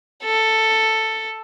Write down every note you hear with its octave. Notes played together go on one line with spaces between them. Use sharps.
A4